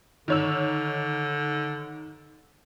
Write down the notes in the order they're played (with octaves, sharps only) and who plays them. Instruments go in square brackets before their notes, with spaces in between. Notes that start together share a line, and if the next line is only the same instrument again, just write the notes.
[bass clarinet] D3 [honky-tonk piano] D#3 C#5 E6